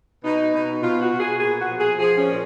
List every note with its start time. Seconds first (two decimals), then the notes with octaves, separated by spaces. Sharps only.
0.24 B2 D#4
0.53 B2
0.82 B2 F4
1.01 F#4
1.11 B2
1.20 G#4
1.40 A#2 G#4
1.59 F#4
1.69 F3
1.79 G#4
1.98 F3 G#4
2.17 C#4
2.26 A#2